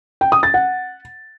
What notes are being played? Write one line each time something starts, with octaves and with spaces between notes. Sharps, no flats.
G5
D#6
A6
F#5